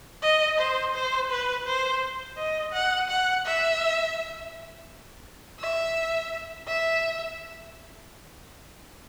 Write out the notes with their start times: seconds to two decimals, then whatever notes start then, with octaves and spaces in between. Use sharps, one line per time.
0.23 D#5
0.58 C5
0.95 C5
1.31 B4
1.66 C5
2.38 D#5
2.73 F#5
3.09 F#5
3.45 E5
5.60 E5
6.68 E5